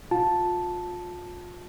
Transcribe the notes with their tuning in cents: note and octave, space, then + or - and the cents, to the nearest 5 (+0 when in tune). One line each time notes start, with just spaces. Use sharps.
F4 +30 A5 +0